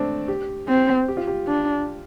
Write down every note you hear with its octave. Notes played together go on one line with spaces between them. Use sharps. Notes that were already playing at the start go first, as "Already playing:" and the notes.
Already playing: A3 C4 D4
G4
C4
G4
F4
G4
D4